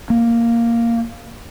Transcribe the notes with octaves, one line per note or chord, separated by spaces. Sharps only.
A#3